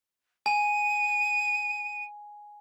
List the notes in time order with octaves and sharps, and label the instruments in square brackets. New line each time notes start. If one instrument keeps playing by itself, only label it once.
[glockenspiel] G#5 [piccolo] D#7